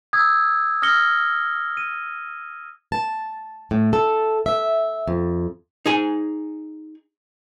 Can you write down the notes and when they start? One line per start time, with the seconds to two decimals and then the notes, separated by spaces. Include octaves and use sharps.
0.13 D#6 E6 G#6
0.82 D#6 F6 A#6 C#7 G7
1.77 D#7
2.92 A5
3.71 A2
3.93 A4
4.46 E5
5.08 F2
5.86 D#4 G#4 G#5